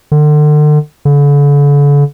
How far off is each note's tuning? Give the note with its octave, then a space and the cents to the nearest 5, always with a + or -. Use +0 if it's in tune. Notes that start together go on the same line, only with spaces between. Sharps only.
D3 +35
D3 -40